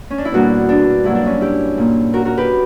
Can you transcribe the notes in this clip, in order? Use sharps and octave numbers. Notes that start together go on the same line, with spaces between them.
C#4
D4
E4
E2 B2 G3 A#3 D4 F#4
D4
G2 F#3 A#3 E4
D4
C#4 E4
E4 G4
A#2 A#3
F#4 A#4
F#4 A#4
G4 B4